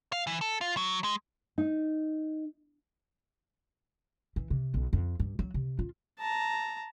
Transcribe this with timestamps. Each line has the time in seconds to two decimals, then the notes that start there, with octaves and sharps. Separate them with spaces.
0.13 F5
0.27 E3
0.41 A4
0.61 F4
0.77 F#3
1.04 G#3
1.58 D#4
4.36 E3
4.50 C3
4.74 B1
4.93 F2
5.20 G2
5.39 F#3
5.54 C3
5.79 F4
6.19 A5 A#5